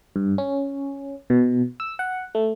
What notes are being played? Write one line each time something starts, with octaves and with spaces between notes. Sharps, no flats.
G2
C#4
B2
E6
F#5
A3